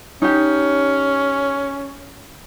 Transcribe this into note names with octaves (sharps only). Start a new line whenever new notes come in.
C#4 D#4 G4